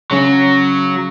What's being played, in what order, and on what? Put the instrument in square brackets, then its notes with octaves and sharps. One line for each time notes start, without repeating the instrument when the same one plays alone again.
[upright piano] C#3 C#4 [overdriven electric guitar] F#3